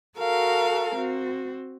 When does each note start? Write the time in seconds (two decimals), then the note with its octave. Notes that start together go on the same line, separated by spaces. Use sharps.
0.18 F#4 A4 A#4 F5
0.96 C4 F#4